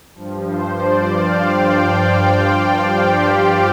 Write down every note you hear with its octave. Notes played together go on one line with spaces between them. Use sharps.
G2 F3
C5
D5
F5
G5
G5
G4